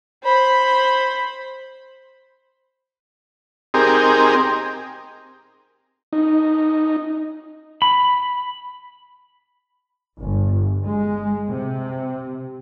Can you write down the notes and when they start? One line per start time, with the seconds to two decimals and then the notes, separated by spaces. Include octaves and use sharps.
0.24 C5 B5
3.74 C4 D#4 G4 G#4 A#4
6.13 D#4
7.82 B5
10.20 G1
10.85 G#3
11.49 C3